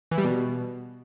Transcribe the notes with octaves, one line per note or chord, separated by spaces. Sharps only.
E3
G3
B2